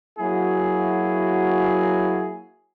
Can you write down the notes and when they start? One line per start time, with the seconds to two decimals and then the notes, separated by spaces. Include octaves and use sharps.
0.19 F#3 A#3 E4 F#4 G#4